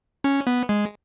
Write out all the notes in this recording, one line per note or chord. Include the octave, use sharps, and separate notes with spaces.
C#4
B3
G#3